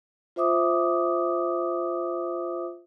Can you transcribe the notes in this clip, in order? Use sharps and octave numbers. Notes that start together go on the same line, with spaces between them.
F4 C5 E5 D6 D#6